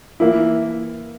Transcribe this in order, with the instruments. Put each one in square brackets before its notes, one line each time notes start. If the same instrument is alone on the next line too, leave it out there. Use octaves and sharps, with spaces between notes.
[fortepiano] E3 A#3 E4